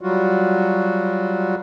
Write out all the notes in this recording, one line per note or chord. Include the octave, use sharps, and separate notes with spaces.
F#3 G3 F4 F#4